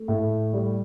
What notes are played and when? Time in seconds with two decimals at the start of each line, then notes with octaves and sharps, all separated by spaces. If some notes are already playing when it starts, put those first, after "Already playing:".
Already playing: A3
0.08 A2
0.53 G3